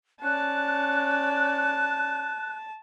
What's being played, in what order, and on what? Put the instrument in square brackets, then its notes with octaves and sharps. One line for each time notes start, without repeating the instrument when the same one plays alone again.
[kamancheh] C#4 D5 [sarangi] A5 [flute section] F#6